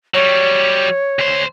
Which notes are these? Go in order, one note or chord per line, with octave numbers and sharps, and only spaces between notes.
F#3 G3 C#5
D2 C5